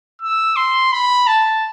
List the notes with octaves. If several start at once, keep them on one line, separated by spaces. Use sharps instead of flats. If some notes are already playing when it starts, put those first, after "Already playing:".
E6
C6
B5
A5